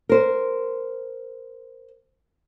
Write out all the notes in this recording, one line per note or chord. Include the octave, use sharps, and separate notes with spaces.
A#4 C5